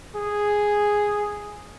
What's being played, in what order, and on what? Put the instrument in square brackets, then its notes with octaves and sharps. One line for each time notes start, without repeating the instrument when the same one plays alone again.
[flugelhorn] G#4